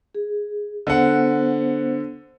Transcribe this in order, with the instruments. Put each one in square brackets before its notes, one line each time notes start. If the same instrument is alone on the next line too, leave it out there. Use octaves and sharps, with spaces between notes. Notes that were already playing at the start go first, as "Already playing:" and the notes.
[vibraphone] G#4
[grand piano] D3 F#5 [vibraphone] B3 C5